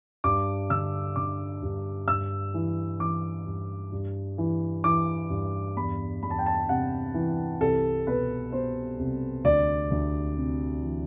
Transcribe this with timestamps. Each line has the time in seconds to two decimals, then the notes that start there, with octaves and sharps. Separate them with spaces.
0.24 G2 D6
0.70 D3 E6
1.16 D3 D6
1.62 G2
2.08 G2 E6
2.54 E3
3.00 E3 D6
3.46 G2
3.92 G2
4.38 E3
4.84 E3 D6
5.30 G2
5.77 E2 B5
6.22 E2 B5
6.30 A5
6.39 G5
6.46 A5
6.68 C3 F#5
7.14 E3
7.60 C2 A4
8.07 B2 B4
8.52 B2 C5
8.99 C2
9.44 D2 D5
9.91 D2
10.37 C3
10.82 E3